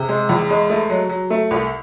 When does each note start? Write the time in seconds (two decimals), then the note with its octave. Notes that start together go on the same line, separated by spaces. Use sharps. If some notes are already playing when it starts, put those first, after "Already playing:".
Already playing: C3 G#4
0.08 G#3
0.29 E2
0.50 G#3
0.70 A3
0.90 F#3
1.09 F#3
1.30 A3
1.51 C2